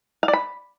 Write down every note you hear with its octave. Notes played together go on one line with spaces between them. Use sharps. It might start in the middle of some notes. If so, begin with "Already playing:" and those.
F5
D5
B5